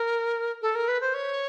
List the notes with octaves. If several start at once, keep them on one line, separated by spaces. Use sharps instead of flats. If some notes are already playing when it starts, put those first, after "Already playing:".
Already playing: A#4
A4
A#4
B4
C5
C#5